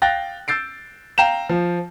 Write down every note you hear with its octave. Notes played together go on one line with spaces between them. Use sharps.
F5 G5 F#6 A6 A#6
E6 G6 A6 C7 D7
F5 G5 A#5 G6 E7
F3